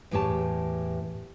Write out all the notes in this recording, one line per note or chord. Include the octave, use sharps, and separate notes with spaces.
E2 A2 G4 C#5 A5